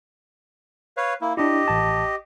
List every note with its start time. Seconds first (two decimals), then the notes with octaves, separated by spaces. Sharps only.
0.97 B4 C#5 F5
1.21 A#3 E4
1.37 D4 E4 G4 D#5
1.68 A1 A5